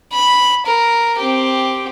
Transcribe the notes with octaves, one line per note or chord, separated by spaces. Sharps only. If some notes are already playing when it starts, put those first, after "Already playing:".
B5
A#4
C4 G4